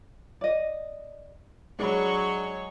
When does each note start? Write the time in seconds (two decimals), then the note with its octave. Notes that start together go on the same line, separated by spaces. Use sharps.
0.41 D5 D#5
1.79 F#3 G#3 D4 G#4 C#5 B5 C#6